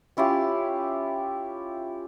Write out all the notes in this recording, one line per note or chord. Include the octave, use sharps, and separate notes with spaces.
C#4 E4 F4 G4